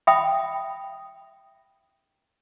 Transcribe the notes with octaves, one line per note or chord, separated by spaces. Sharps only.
E5 G5 B5 D#6